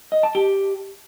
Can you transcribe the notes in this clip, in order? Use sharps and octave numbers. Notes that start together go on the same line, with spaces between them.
D#5
A5
G4